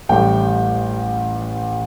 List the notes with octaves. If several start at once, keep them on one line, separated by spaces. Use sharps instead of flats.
A1 A2 G3 G5